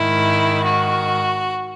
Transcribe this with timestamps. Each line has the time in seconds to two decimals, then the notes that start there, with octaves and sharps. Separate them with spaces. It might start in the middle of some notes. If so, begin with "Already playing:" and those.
Already playing: G#2 D#3 E4
0.66 F#4